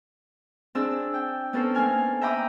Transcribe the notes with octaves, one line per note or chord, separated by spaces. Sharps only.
C4 D4 G#4 E6
G5
B3 C#4 A4 A#4 C5
A#3 D#4 G#5 F6
E5 G5 A#5 B5 D6 D#6